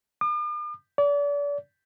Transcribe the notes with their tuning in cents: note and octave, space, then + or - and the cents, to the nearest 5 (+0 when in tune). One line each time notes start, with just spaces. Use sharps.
D6 +45
D5 -35